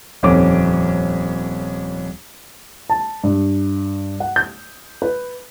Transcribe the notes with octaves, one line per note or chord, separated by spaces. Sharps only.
D#1 F2 C#4 D6
A5
G2
F#5
G6
B4